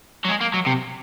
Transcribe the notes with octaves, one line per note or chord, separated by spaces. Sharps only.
F#3
G#3
A#3
F#3
C3